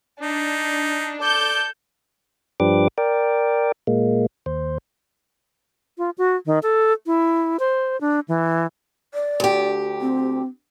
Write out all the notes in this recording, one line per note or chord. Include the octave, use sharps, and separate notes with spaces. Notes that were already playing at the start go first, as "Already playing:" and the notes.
D4 D#4
A4 D5 G6
G2 F3 D4 G4 B4 D6
A#4 D5 G5
A#2 G#3 A#3
D#2 C5
F4
F#4
D#3
A4
E4
C5
D4
E3
D5
D2 G4
C4